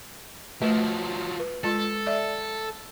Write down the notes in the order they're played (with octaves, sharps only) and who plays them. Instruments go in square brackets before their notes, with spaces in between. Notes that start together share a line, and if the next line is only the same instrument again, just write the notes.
[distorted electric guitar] F3 F#3 [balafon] A3 B4
[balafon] B4
[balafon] G#3 F4 [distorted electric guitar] A4
[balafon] D5 E5